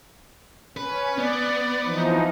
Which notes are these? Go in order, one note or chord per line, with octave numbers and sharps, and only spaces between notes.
C#4 B4
B3 D5
E3 F3 D#4